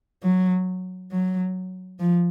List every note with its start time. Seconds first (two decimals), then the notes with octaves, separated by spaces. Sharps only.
0.23 F#3
1.12 F#3
1.99 F3